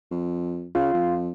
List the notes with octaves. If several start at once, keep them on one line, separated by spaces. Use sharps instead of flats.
F2
C#3 F4 F5
F2